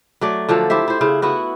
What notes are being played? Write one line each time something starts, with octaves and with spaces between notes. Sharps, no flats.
F#3 A3 D5
D3 F3 F#3 A4
E4 G4 C5 E5
E4 C5
C#3 E4 F5
B3 E4 F#4